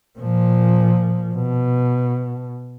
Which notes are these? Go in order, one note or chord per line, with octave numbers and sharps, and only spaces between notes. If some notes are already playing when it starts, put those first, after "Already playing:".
A#2 F3
B2